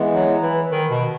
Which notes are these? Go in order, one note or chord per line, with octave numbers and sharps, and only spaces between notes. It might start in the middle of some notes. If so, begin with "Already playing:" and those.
Already playing: E3 G#3 B3
F#3
E3
D#3
B2